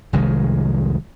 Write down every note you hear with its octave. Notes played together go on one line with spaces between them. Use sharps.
F1 C2 D#3 G#3